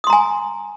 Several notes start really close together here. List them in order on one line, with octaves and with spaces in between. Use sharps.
D#6 C6 A#5 G#5